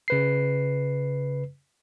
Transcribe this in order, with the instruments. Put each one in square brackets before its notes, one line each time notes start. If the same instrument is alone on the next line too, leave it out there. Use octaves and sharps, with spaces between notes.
[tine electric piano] C#3 B4 C7